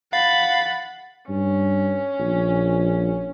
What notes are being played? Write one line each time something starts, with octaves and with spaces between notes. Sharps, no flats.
F5 F#5 B5 A6
G2 C#4
A#1